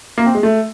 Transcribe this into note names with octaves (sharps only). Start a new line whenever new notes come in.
A#3
C4
G#3
A3